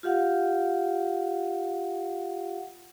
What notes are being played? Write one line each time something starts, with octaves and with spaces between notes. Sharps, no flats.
F4 G4 F5 F#5